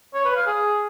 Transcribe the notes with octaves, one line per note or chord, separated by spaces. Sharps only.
C#5
B4
F5
G#4